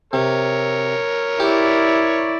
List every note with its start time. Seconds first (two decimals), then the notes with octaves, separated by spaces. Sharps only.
0.13 C3 A#4 C#5
1.40 E4 G4 D5